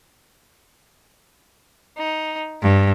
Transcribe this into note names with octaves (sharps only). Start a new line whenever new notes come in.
D#4
G2